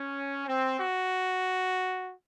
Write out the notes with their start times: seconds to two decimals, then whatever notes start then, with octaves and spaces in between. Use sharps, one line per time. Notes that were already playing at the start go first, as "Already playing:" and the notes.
Already playing: C#4
0.47 C4
0.80 F#4